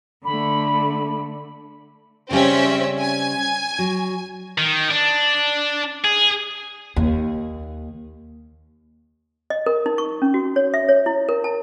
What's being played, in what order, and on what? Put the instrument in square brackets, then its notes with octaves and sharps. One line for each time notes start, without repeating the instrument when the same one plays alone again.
[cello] D3 A3 [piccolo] B5
[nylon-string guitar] C#3 G3 [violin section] C4 C#4 E5
[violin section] G#5
[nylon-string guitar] F#3
[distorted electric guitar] D#3
D4
G#4
[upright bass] D#2
[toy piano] D#5
A#4
D#4
C#6
C#4
F#4
C#5
E5
C#5
E4
A#4
A5